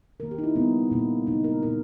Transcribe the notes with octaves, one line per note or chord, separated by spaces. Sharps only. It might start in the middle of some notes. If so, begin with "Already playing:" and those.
D#3 A#3 A#4
G4
D#4
E4
C#3 G3 A#3 B3
A#2 A#3
C#3 G#3 D#4
A#4
A#2 A#3 A#4